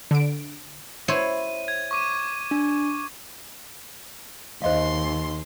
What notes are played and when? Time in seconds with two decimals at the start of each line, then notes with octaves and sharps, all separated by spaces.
0.11 D3 D7
1.08 E4 C5 C#5 D#7
1.68 G#6
1.91 C#6 D6 D#7
2.51 D4
4.62 D#2 C5 D#5 F5 C6